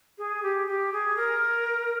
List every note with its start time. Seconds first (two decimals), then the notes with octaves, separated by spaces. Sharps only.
0.18 G#4
0.42 G4
0.67 G4
0.92 G#4
1.17 A#4